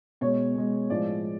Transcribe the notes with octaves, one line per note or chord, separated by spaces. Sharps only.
B2 G#3 C#5
B2 G#3
A2 F3 G#3 D5